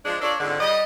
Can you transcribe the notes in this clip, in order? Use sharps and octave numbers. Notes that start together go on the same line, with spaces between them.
F3 G#3 D4
D4 F4 A4 A#4 C#5 D5
F2 G#2 D3
G3 D#5